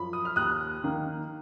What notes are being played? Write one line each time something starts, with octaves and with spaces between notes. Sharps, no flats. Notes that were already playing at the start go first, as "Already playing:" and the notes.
Already playing: F#2 F3 B5
D#6
F6
D#2 D#6 F#6
D#3 A#3